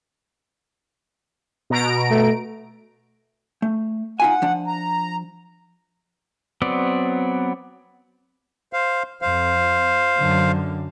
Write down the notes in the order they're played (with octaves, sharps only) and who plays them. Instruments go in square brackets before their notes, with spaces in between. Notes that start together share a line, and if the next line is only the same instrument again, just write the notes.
[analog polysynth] B2 A#5 D7
[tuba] A3
[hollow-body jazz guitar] A3
[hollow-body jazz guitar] D#4 F4 G#5 [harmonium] F#5
[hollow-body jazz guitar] F3 D4
[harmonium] A#5
[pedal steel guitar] F#3 B3 C4 D5
[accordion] C5 F5
[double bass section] F2 [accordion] C5 F5
[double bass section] F#2 D3